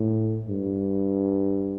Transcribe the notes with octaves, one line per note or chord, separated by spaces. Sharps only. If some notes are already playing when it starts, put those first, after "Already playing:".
Already playing: A2
G2